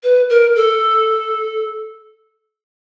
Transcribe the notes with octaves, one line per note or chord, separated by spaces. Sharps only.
B4
A#4
A4